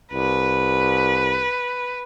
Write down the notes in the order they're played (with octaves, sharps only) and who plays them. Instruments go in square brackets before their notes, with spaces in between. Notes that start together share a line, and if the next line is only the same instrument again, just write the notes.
[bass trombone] C2 [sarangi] B4